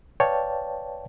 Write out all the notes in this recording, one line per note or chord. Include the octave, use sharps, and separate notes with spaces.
B4 C#5 D5 F5 G5 A5